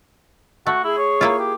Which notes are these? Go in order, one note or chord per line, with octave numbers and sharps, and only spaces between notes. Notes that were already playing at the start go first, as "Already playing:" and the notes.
A3 F#4
E4 G#4
C#5
A#3 E4 F4
G4